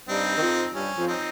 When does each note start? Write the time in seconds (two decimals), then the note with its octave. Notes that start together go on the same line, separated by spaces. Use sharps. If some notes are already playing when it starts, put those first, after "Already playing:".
0.09 G2 G3 C4 D#4
0.37 D#3
0.41 F2 F3
0.74 G2 G3 C#4
0.96 F2 F3
1.07 C4 D#4